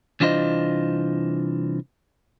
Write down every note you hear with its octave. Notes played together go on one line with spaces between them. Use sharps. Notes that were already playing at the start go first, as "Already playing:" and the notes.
C2 E3 D4 F4 C5 D#5